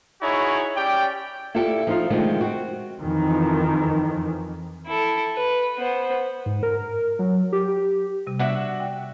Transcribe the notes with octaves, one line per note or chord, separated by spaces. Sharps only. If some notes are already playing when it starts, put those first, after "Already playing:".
D#4 E4 F#4 G#4 C#5
C#4 G4 D5 G5
E4 F4 G4 A4 D5 E5
F3 D#4 F4
D3 D#3 F3 G#3 A3 C4
C4 F#4
F2 D#3 E3
E4 A4
B4
B3 C5
G#2
A#4
F#3
G4
C3 G3
D4 F#4 E5
G5